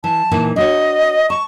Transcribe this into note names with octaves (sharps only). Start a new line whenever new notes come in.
E3 A5
A#2 E3 D#4
D4 F#4 C#5 D#5
A5 C#6